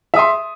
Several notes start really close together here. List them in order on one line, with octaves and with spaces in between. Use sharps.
E5 D#6 C6